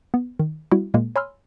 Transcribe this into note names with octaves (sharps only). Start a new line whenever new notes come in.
B3
D#3
G3 C4 E4 F#4
A#2 G#3 A#3
C#5 G#5 B5 C6 E6 F6